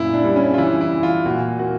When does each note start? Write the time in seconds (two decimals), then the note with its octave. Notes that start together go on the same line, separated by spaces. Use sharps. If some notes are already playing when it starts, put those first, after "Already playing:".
Already playing: F#2 A#2 E4
0.14 D4
0.24 G3
0.36 C#4
0.54 F4
0.58 E3 E4
0.81 E4
0.92 E3
1.03 F4
1.26 A#2 F#4
1.59 A#3 F#4